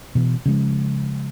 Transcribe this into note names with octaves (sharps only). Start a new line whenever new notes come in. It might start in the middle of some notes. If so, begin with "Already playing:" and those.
B2 E3
C#3 F3 G#3